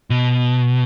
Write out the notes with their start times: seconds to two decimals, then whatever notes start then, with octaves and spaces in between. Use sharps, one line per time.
0.10 B2